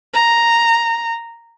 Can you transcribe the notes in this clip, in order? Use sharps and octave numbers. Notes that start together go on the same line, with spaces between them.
A#5